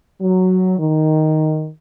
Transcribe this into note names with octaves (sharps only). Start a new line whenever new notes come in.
F#3
D#3